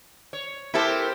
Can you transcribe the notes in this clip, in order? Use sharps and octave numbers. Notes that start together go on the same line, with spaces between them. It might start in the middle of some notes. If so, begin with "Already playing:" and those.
C#5
C4 E4 G4 A4 A#4 C5 A5